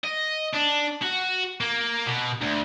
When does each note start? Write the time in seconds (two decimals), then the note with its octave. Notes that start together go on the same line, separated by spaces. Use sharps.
0.04 D#5
0.53 D4
1.02 F#4
1.60 A#3
2.06 B2
2.41 D2